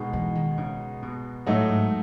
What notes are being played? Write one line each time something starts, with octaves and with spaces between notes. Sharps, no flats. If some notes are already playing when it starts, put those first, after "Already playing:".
Already playing: B2 G#3 D#4
E3
D#3
C#3
B2
A2 F#3 A3 D#4
G#2